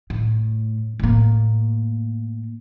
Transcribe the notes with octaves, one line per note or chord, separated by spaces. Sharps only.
A2
A2 A#3